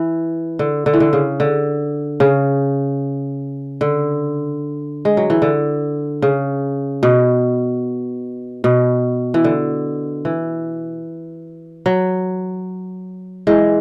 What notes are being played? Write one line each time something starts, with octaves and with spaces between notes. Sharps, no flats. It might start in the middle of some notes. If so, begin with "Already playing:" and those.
Already playing: E3
D3
D3
E3
D3
C#3
D3
C#3
D3
G#3
F#3
E3
D3
C#3
B2
B2
E3
D3
E3
F#3
E3 G#3